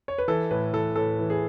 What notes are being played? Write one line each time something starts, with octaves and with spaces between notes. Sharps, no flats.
C#5
B4
E3 A4
A2 B4
E3 A4
A2 A4
E3
G#4